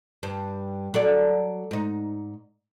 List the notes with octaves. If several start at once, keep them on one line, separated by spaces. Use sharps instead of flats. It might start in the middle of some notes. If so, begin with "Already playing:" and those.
G2
F#3 A4 D5
G#2 D#4